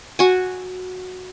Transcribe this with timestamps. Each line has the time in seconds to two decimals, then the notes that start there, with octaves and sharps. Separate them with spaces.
0.19 F#4 G#5